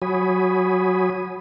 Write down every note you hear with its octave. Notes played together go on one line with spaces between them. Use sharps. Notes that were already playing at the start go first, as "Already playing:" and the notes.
F#3 F#4 C#5 G#5 B5 D#6